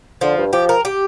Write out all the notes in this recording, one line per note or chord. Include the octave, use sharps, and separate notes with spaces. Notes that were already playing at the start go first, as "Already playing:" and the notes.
D3 F3
G2
F3 G4
A#4
G4